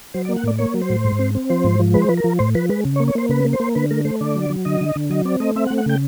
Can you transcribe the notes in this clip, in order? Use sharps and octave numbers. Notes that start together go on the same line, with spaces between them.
F#3 C5
D5
A#3
F#5
A2 D5
A#3 C#5
F#3
C5
A2
G#2
C4
C4
F3 C5
G#2
F3
G#3 B4
C5
F3 B4
A#4
F3
A2 C5
F3 B4
G#3 B4
C#3
C#5
A#3
C#5
A#3 C5
C#3 B4
A#3
C5
A#3
D3 B4
A3 A#4
A3 C5
D3 D5
F#3
F#3
D3 D#5
D3
D3
F#3 D#5
C4 D5
A3 D#5
C4 E5
F#5
A3
F#5
C#3 G5